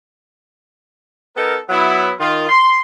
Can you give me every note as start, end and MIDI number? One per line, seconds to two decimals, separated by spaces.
1.36 1.57 59
1.36 1.57 63
1.36 1.57 69
1.36 1.57 70
1.69 2.11 54
1.69 2.11 59
1.69 2.11 64
2.19 2.49 51
2.19 2.49 65
2.49 2.80 84